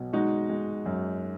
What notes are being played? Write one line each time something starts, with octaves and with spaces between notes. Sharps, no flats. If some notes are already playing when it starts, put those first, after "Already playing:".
Already playing: B1 B2
G#3 D#4 F#4
G#3
F#2